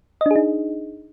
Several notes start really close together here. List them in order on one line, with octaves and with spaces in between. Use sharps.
D#5 D4 G#4 D#4